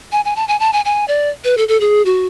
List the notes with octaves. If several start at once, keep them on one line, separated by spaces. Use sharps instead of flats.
G#5
G#5
A5
G#5
A5
G#5
G#5
D5
B4
A4
A4
G#4
F#4